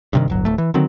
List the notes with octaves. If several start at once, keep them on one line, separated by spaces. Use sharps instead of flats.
G2 C3 D#3
D1 G1 F#3
D1 A3
E3
D3 D#3 F#3 C4